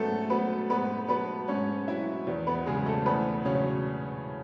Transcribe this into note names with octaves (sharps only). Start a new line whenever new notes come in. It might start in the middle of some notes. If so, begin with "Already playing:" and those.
Already playing: G#2 F#3 A3 B3 C#4 A4
F#3 B3 B4
G#2 B3 B4
F#3 B3 B4
G#2 C#4 C#5
F#3 E4 E5
E2
B3 B4
C#3 F#3 G#3 G#4
A3 A4
E2 B3 B4
C#3 F#3 C#4 C#5